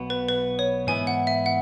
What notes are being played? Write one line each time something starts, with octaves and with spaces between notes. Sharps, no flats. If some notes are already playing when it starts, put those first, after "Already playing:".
Already playing: B1 B2 B3
B4
B4
C#5
G#2 E3 B3 E4 G#5
F#5
E5
F#5